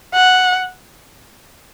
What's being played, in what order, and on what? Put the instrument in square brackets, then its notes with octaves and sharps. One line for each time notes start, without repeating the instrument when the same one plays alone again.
[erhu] F#5